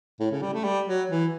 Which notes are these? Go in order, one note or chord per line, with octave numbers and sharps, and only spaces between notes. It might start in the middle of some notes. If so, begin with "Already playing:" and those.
A2
C#3
G3
A3
G3
F#3
E3